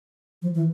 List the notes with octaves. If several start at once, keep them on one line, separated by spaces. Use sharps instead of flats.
F3
E3